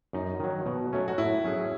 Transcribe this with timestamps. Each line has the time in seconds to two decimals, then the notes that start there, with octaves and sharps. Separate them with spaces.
0.13 F#2 D#4
0.40 D#3 F#3
0.66 B2
0.93 F#3 A3 C#4
1.08 F#4
1.18 A2 E4
1.44 F#3 C#4 G#4